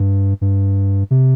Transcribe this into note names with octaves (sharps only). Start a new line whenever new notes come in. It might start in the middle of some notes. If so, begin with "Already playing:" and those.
Already playing: G2
G2
C3